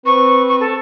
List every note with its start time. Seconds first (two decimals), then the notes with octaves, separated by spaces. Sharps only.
0.06 C4 B4 C#6
0.48 C#6
0.61 A4